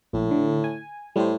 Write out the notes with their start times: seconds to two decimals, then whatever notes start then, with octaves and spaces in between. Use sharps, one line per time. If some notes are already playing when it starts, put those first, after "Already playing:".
0.13 A#1 A2
0.31 D3
0.64 G#5
1.16 A2 G3 C5